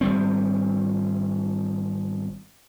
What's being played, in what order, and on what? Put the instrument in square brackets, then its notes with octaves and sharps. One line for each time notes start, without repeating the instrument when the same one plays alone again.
[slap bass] G#1 G3 C4